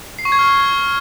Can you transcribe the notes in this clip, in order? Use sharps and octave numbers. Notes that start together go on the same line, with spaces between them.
C7
C#6
G#6
F6